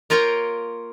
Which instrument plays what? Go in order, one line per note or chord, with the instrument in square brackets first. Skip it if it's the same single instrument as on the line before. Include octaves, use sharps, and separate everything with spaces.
[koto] A#3 F4 A#4 C#5 G5